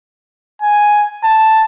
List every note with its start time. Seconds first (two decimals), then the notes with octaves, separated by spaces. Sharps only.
0.62 G#5
1.24 A5